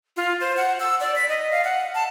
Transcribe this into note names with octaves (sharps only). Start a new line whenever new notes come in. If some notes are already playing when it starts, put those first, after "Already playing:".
F4
C5
F#5
E6
D5
B6
D#5
F5
F#5
A5